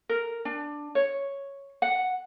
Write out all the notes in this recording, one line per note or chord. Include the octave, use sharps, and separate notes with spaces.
A#4
D4
C#5
F#5